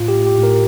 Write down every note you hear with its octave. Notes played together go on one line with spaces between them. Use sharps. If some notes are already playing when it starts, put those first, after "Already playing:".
Already playing: A2 F4
G4
A2
G4
A2
A#4